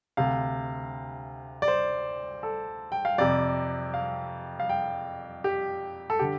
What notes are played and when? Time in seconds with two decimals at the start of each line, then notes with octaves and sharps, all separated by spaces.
0.17 D2 C3 F5
1.62 D5
1.68 C5
2.43 A4
2.92 G5
3.05 F5
3.18 F2 C3 D5
3.94 F5
4.60 F5
4.69 G5
5.44 G4
6.10 A4
6.19 D3 G4